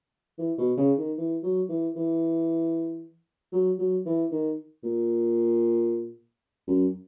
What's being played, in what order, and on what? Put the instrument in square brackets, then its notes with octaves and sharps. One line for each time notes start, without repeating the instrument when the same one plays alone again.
[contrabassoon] E3
B2
C#3
D#3
E3
F#3
E3
E3
F#3
F#3
E3
D#3
A#2
F#2